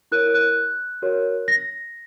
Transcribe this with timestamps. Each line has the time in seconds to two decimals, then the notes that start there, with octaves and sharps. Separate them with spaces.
0.12 E4 A#4 C#5 F#6
0.34 F#6
1.02 F#4 A#4 C#5
1.48 A#6